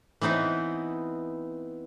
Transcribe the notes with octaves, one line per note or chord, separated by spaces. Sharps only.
E3 B3 C4 D#4 E4